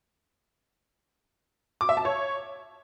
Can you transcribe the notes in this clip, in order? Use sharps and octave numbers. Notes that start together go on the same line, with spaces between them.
D6
E5
A5
C#5